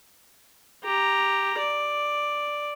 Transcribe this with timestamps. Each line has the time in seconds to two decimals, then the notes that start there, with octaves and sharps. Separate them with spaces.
0.84 G4 A#5
1.59 D5